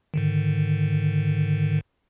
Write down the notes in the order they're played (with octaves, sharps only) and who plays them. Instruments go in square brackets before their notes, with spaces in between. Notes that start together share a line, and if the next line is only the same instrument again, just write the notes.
[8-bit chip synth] G#2 D3 D#3